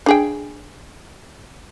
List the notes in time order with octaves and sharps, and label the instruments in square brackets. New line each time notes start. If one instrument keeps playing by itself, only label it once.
[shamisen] D4 G#4 G5